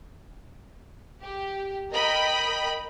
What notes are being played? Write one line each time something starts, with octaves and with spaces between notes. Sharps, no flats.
G4
A#4 D#5 G5 B5